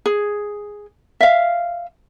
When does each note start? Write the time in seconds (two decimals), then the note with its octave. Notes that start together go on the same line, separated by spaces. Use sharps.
0.06 G#4
1.20 E5 F5